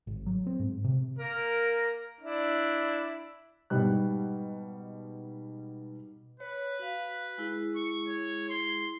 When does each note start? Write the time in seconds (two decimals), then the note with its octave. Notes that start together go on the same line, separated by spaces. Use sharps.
0.07 G#1
0.26 F#3
0.47 C4
0.60 G#2
0.84 C3
1.19 A#3 A#4
2.21 D4 E4
3.70 G#2 B2 G3 F#6
6.40 B4 C#5
6.79 F#4 F5
7.38 G#3 E4 G#4
7.76 C#6
8.08 C#5
8.50 C6